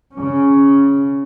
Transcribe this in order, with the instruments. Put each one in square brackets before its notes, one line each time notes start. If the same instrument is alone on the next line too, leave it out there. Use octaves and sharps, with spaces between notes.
[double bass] C#3 C#4